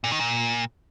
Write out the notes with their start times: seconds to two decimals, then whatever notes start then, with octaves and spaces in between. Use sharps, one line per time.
0.04 A#2
0.12 D#3
0.20 A#2